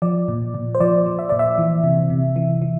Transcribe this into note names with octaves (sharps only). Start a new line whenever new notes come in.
F3 D5
A#2
A#2
C5
F3 D5
F3
E5
A#2 D5
E5
E3
C3
C3
E3
E3